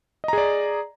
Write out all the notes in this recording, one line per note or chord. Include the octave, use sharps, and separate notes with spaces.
G#4 D5 D#5 A#5